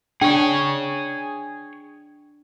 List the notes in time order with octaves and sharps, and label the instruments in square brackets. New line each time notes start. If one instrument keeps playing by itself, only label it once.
[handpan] D4 [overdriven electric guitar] G#4 C#5 [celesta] G5